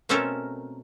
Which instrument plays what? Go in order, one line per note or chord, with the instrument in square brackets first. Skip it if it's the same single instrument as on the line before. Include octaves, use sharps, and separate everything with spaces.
[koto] B2 A3 C4 C#4 A4 A#4